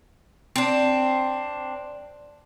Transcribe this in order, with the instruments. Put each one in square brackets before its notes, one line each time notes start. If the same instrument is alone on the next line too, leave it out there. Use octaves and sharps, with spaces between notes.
[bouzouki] C4 D4